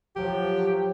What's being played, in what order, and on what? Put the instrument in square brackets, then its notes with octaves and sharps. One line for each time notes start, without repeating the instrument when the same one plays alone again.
[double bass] F3 F#3 [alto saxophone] G4